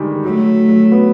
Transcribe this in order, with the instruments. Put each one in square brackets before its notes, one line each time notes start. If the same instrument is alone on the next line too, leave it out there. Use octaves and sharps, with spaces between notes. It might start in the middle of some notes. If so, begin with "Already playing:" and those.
Already playing: [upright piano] D3 D#3 G3 G#3
[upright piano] F#3 [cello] A3
[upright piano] F#3
B3